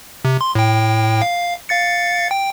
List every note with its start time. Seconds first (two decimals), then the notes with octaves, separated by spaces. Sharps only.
0.25 C3
0.41 C6
0.55 A2 G5
1.22 F5
1.69 F5 A6 C#7
2.31 G5